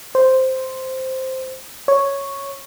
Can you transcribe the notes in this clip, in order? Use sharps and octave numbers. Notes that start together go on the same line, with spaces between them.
C5
C#5